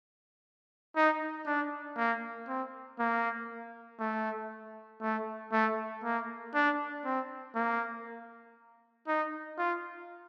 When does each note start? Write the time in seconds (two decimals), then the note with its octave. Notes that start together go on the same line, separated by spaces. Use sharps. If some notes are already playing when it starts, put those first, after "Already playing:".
0.96 D#4
1.46 D4
1.97 A#3
2.48 C4
2.99 A#3
4.00 A3
5.02 A3
5.52 A3
6.04 A#3
6.54 D4
7.05 C4
7.55 A#3
9.08 D#4
9.58 F4